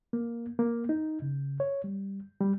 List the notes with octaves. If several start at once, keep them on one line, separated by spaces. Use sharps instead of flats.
A#3
A#3
D#4
C#3
C#5
G3
G3